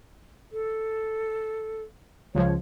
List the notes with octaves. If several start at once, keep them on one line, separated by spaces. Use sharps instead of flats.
A4
C#2 F3 C#5